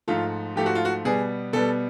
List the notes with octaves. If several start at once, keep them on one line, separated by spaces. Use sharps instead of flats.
G#2 F3 A3 F4
G#2 F3 A3 G4
F#4
F4
F#4
B2 G3 B3 G#4
B2 G3 B3 A4